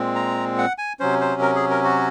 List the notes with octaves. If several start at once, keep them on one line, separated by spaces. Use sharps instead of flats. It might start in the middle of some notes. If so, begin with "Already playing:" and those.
Already playing: A#2 G#3 C4
A#5
F#5
G#5
C3 F#3 C#4 C5
C5
A#4
G#4
A#4
F#4